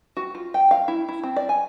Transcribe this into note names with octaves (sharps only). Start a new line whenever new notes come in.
F#4
F4
G5
F5
E4
E4
C4
D5
G#5